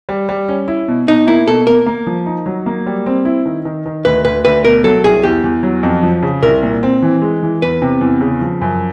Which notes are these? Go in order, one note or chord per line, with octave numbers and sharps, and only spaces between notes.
G3
G3
C#4
E4
B2
B2 D#4
A#3 E4
B2 A4
A#3 A#4
A#3
F3
D#4
F#3
A#3
G3
C4
E4
D#3
D#3
D#3
D2 B4
D2 B4
D2 B4
B2 A#4
F#3 A4
C2 G#4
E2 G4
E2
F#3
F2
F3
C#3
C2 A#4
A#2
C4
E3
G#3
E3
E2 B4
C3
E2
C#3
F3
F#2